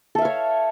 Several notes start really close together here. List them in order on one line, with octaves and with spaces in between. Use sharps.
A4 E5 F5 C#5